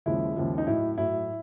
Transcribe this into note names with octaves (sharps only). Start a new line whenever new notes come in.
D#2 C#3 F3 G#3 E4
D#2 C#3 F3 G#3
D#4
A2 F#3 E4
A2 F#3 E4